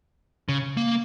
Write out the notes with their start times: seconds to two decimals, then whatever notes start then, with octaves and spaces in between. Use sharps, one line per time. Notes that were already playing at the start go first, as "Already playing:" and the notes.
0.49 C#3
0.77 A#3